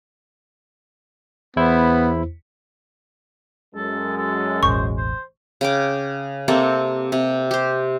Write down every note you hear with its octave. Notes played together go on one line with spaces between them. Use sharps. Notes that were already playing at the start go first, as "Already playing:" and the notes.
E2 B3 E4 C5
F#2 G#3 A4
A4
E1 A1 C5 C#6
C5
C#3 G5 D6
C3 A#3 C4 A4
C3
G4 C5